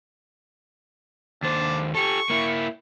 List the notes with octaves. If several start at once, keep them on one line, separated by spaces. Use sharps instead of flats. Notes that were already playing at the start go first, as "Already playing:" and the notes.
D#2 D4 C5
G4 A4 C#6
A#3 E4